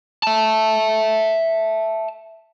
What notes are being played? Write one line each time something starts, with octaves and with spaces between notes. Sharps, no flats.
E5 A5